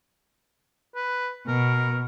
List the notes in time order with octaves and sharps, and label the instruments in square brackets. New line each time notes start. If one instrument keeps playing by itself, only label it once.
[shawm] B4
[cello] B2 [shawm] A#4